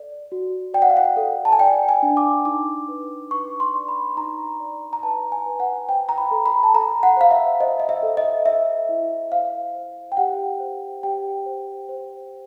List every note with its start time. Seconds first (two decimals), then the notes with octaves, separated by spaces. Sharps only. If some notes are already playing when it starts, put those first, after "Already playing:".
Already playing: A4 D5
0.32 F#4
0.74 D5 G5
0.82 F#5
0.90 F5
0.97 F#5
1.17 A4
1.45 A5
1.53 G#5
1.59 D5 G5
1.89 G#5
2.03 D4
2.17 D6
2.45 D#4 D6
2.88 B4
3.31 B4 C#6
3.60 C6
3.74 D5
3.88 B5
4.17 D#4 A#5
4.60 D5
4.93 A#5
5.03 B4 A5
5.32 G#5
5.46 B4
5.60 F#5
5.89 C5 G5
6.09 A#5
6.18 B5
6.31 A4
6.46 B5
6.63 A5
6.74 A4 A#5
7.03 F#5
7.17 C5 F5
7.31 E5
7.60 C5 D#5
7.80 D#5
7.89 E5
8.03 A4
8.17 D#5
8.46 A4 E5
8.89 E4
9.31 C5 F5
9.75 C5
10.12 G5
10.17 G4 F#5
10.60 C5
11.03 G4 G5
11.46 C5
11.89 C5